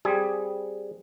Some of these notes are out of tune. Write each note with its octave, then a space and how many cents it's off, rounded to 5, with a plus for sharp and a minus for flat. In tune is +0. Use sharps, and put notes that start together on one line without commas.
G3 +0 C4 +5 G#4 +0